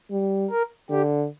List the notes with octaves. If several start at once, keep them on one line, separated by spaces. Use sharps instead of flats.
G3
A#4
D3 G4